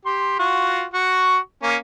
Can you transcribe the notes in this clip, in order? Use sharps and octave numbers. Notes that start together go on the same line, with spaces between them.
G4 C6
F4 F#4
F#4 C#6
A#3 C#4